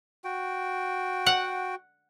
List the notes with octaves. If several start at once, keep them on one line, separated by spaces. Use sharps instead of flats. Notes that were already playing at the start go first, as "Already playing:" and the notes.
F#4 G5
F#5